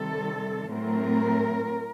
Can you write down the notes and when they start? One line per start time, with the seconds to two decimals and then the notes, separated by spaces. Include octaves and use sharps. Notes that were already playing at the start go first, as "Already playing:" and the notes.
Already playing: C3 D#3 G3 A4
0.68 A2 F#3 A3 C4 A#4